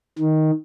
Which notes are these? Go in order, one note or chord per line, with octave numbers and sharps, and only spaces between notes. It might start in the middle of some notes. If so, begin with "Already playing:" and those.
D#3